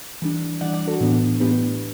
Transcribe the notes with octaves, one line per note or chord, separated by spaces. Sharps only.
E3 G3 D4
E3 G3 D4 D5 F#5
D5 F#5
F#4 A4
A2 E3 B3 D4
A2 E3 B3 D4 G4 B4